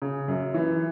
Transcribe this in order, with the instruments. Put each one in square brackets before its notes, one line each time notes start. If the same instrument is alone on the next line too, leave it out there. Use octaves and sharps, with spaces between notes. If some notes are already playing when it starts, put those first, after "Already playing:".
[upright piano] C#3
F#2
E3